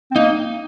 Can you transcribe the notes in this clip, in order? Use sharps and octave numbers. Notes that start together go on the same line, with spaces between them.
C4
A#3 D#4